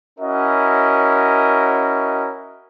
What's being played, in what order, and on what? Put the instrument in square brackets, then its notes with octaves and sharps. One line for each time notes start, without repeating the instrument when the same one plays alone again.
[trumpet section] C#4 E4 F#4 A#4 D#5